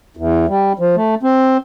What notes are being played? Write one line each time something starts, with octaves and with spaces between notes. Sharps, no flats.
E2
G3
F3
A3
C4